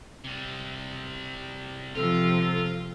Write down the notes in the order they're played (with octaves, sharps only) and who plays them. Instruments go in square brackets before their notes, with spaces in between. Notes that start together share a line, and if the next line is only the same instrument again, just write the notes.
[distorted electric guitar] C3 G3
[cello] C3 F3 [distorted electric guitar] F4 [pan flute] A4